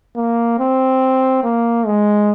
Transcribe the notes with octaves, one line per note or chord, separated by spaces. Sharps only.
A#3
C4
A#3
G#3